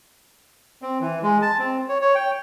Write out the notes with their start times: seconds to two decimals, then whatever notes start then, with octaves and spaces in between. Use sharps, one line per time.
0.82 C4
1.01 E3
1.23 G#3
1.42 A5
1.59 C4
1.89 C#5
2.01 C#5
2.15 G5